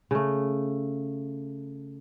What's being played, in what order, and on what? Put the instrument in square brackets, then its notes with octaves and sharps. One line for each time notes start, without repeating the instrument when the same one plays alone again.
[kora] C#3 A3